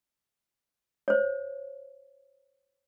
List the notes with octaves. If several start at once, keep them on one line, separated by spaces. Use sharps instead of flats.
C5 C#5